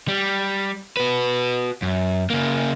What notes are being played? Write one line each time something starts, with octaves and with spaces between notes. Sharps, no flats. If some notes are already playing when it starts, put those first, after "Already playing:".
G3
F#4 B4
F#2
C#3 A#3